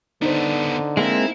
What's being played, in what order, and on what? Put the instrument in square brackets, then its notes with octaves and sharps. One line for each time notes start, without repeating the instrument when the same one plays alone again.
[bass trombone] D3 [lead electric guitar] B3 D4 [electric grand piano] D#4 C5
[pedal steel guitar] G#3 A#3 C4 [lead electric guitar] E4